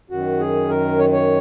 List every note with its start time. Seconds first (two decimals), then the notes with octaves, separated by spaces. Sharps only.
0.10 F#2 D#3 F#4
0.40 G#4
0.69 A#4
0.98 C#5
1.13 C#5